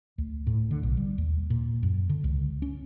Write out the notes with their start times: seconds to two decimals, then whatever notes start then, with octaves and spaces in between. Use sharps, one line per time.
0.18 D2
0.47 A2
0.71 D3
0.83 B1
0.97 G3
1.18 D#2
1.50 A#2
1.83 F#2
2.09 D3
2.24 C#2
2.62 C#4